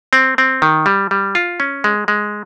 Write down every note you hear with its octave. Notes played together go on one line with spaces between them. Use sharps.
C4
C4
D#3
G3
G3
F4
C#4
G#3
G#3